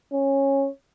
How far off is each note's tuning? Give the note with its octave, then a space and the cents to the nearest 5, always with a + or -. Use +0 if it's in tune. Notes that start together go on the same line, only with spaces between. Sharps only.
C#4 -15